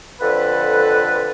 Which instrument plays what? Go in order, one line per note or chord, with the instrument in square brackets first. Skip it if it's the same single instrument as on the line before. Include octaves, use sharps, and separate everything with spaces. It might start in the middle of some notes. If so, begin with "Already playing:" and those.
[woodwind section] F2 D3 A4 B4